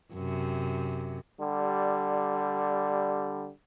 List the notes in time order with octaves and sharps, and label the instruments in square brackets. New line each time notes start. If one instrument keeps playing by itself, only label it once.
[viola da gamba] F#2 C3
[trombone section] D3 G3